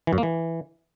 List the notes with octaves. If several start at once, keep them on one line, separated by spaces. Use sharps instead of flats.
E3
F#2
A#3
E3